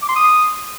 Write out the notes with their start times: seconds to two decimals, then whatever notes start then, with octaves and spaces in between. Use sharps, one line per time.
0.02 D6
0.09 C6
0.16 D#6